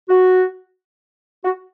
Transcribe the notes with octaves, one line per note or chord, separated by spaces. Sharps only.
F#4
F#4